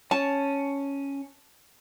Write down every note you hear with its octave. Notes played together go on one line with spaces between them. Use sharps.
C#4 A5